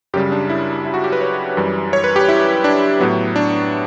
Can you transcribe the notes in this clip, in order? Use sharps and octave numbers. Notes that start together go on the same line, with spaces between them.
F#2 C#3 G3 G4
D4
E4
E4
F#4
G4
B4
C#5
F#2 E3 G3
C#5
B4
G4
E4
D4
A2 F#3 B3
D4